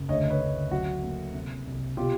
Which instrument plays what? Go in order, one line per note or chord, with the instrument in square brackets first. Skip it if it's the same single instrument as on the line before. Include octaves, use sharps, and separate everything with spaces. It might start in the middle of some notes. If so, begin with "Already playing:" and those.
Already playing: [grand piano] F#1
D2 C#5 D#5
B4 C#5
D2
F#3 F#4
A#3
C3
C2
B2 F4 G4